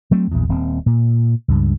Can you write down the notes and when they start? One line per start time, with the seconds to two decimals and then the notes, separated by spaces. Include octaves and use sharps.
0.11 F#3 A3 C4
0.31 A#1 E2
0.49 D#1 C4
0.86 A#2
1.48 C#2 G2